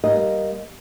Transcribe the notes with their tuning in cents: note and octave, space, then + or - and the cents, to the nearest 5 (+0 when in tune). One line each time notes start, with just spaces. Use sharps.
G3 -10 A#3 +0 D#5 +0